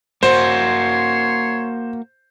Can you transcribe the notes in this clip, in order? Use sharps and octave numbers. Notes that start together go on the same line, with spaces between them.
A#3 F#4 C5 C#5 C6